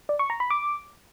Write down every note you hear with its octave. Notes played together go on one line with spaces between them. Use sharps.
D5
C#6
A#5
B5
D6